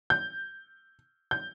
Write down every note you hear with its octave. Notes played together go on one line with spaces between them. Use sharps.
G6
G6